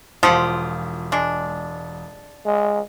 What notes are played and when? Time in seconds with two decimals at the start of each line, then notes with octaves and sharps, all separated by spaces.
0.23 E1 F3 F4 G4 F#5 D#6
1.12 G#3 D4
2.46 G#3